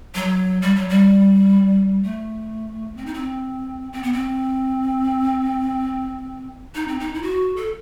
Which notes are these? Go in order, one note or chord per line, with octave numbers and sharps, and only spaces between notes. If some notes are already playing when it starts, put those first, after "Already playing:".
F#3
G3
F#3
G3
A3
C4
D#4
C4
C4
B3
C4
D#4
C4
D#4
E4
F#4
A4